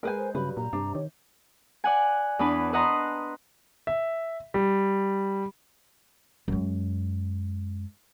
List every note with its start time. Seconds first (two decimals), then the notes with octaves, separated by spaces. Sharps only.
0.03 G#3 A#4 B4 G#5 G6
0.18 C5
0.35 G2 C#3 F#3 B4 B5
0.57 A#2 A#5
0.73 G2 C3 D4
0.95 D#3 C#5
1.84 D5 F#5 G#5
2.39 E2 D4 B4
2.73 B4 D#5 F#5 A#5 C6
3.87 E5
4.54 G3
6.48 F#2 G#3